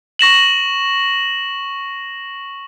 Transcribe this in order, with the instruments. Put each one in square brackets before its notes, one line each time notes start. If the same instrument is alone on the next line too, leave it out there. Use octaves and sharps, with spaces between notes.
[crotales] C#6 A#6 E7 F#7